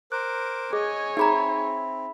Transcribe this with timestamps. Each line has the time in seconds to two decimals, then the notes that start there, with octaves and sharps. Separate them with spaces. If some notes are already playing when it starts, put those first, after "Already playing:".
0.12 A#4 C5 D6 F#6
0.73 G#4 C#5 D#5 G#5
1.17 C4 D#4 G#4 E5 A#5 B5